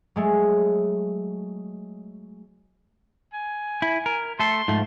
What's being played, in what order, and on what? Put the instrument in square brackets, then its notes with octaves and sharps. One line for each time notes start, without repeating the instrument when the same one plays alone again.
[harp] F#3 G#3 A3
[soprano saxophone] G#5
[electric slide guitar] E4
A#4
[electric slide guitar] A3 A4 [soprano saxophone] C6
[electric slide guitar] G#2 F3 A3